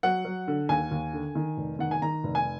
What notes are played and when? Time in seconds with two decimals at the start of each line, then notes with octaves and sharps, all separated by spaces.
0.03 F#3 F#5
0.25 F#3
0.48 D3
0.69 D#2 G#5
0.91 D#2
1.13 D3
1.35 D#3
1.57 F1
1.79 D#3 F#5
1.91 G#5
2.02 D#3 A#5
2.24 F1
2.35 G#5